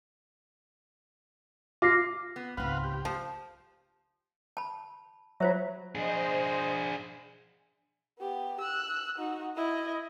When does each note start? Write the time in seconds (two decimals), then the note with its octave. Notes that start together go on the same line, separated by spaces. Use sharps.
1.82 F4 D6 A#6 C7
2.36 B3
2.57 C#2 G#2 C4 F4 B4 F5 F#5
2.84 G4
3.05 F3 C#4
4.57 A5 B5
5.40 F#3 F4 C5 E5
5.95 D4 G#4 C5 D#5
8.19 B3 G4
8.60 E6 F#6
9.18 D#4 F#4
9.56 E4 D#5